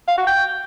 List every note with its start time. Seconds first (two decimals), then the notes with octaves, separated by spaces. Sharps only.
0.08 F5
0.18 F#4
0.27 G5